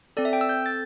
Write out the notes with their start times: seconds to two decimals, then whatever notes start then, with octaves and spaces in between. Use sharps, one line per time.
0.17 C4 A4 D5
0.25 E5
0.33 G5
0.41 E6
0.49 G6
0.66 A6